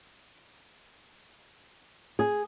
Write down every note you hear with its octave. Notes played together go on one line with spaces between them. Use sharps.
G#4